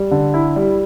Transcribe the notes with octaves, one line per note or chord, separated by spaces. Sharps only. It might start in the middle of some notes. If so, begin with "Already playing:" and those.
Already playing: G3
D3
E4
G3